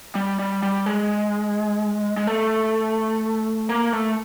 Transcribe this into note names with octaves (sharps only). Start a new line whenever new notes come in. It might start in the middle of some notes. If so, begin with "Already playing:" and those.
G3
G3
G3
G#3
G#3
A3
A#3
A3